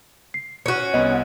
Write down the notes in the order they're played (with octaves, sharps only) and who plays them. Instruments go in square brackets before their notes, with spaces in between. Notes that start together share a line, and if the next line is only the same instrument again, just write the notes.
[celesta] C7
[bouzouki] C#4 F#4
[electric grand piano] C2 B3 [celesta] D#5